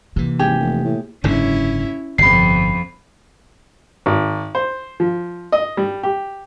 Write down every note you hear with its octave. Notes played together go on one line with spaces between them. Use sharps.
C3 E3 A#3
G#1 G4 G#4
F1
A2
F#1 G#2 D3 C#4 E4
G1 F2 C3 F3 B5 C7
G#1
C5
F3
D#5
G3
G4